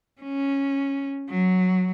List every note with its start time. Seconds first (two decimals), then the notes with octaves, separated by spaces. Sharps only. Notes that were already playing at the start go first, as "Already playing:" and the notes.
0.22 C#4
1.29 F#3